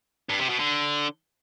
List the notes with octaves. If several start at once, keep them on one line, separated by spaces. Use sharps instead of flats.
G2
C3
B2
D3